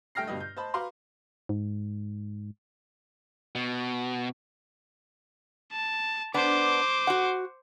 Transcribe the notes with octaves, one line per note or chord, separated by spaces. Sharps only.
G2 A3 G5 F6 A#6 C7
G1 G2 B2 G4 B4 D#5
G6
C5 D#5 A5 B5
F#4 B4 F5 A#5 C6 D6
G#2
B2
A5
B3 D4 C5 D6
F#4 F#5